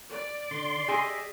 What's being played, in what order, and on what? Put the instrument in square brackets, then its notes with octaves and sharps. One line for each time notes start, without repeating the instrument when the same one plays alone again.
[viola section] D5
[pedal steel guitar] D3 [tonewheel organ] C6
[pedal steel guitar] G4 D#5 E5 [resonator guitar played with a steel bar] G#4